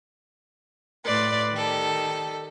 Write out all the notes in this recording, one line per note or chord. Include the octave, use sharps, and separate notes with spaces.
A2 B4 D5 C6 A6
D#3 G3 A4